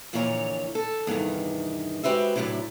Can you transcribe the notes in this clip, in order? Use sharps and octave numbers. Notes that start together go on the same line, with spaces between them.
F2 A#2 D3 E3 C#5 A#5
A4
E2 G2 C3 D#3
G#3 F#4 G4 B4 C5 E5
A2 C3 F3 F#3 D4 E4